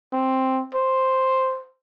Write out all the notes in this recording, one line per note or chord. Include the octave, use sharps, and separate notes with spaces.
C4
C5